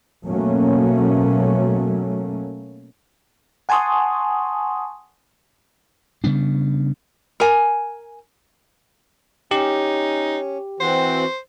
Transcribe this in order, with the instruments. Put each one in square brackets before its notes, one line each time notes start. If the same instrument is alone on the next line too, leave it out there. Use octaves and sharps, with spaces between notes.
[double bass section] B2 F#3 A3 A#3 C#4
[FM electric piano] F#5 G#5 A5 C6 C#6 D#6
[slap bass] C#3 G3 B3 D4
[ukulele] A#4 G#5
[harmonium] C#4 [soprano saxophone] D#4 [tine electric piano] G4
[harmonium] E3 C4 F#4 [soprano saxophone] C5